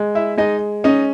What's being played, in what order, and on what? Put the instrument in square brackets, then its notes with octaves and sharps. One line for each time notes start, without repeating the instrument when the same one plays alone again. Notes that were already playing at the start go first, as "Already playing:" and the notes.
Already playing: [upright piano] G#3
[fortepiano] E4 E5
[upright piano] G#3 [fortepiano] D#4 D#5
[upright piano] C#4 [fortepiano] D#4 D#5